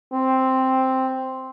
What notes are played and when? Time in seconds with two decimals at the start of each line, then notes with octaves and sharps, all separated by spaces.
0.13 C4